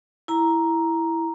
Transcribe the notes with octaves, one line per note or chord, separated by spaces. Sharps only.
E4 A#5